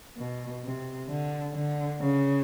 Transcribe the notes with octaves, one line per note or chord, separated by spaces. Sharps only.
B2
C3
D3
D3
C#3